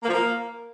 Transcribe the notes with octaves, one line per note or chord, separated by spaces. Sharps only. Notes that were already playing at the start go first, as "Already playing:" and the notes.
A#3
F3
A#3